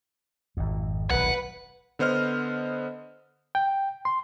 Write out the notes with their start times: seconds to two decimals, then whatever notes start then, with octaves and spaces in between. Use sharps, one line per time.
0.57 G#1 F2
1.10 D#1 B1 B4 F#5
1.99 D3 B3 C5 D#5 F6
3.55 G5
4.05 C6